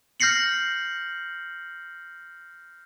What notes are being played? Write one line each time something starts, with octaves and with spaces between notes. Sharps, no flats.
F6 G6 A#6 C7 C#7 F#7